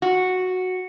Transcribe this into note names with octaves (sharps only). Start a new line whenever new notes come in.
F#4